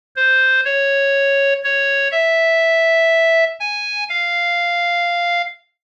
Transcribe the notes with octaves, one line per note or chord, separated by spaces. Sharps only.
C5
C#5
C#5
E5
G#5
F5